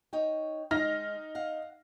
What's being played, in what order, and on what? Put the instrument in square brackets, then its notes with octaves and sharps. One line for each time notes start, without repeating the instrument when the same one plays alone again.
[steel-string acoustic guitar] D#4 C#5 G5
[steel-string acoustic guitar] G#3 [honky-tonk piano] D#4 F6 A#6
[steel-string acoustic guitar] F5 F#5